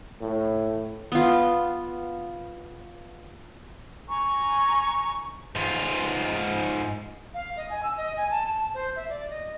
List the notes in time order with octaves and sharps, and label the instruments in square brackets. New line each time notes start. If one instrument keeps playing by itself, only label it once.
[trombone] A2
[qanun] B3 F4
[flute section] G#5 A#5 C#6
[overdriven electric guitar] G#2 F4
[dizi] F5
D#5
G#5
E6
D#5
G#5
A5
A5
C5
E5
D5
D#5